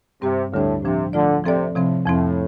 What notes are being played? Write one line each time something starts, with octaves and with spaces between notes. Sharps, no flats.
G2 C3 G3 C4 G4 C5
D2 A2 D3 G3 D4 G4
A2 C3 F3 D4
D3 F3 A3 F4 D5
C3 F3 C4 A4 D5
A2 C3 F3 C4
F2 A2 F3 C4